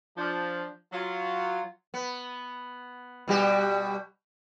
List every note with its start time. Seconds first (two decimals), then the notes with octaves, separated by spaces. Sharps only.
0.18 F3 D4
0.93 F#3 F4
1.94 B3
3.28 B2 G3 G4